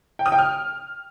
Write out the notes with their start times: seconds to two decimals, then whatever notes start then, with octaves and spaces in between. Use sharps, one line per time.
0.19 G5
0.26 D#6
0.32 G5
0.39 F6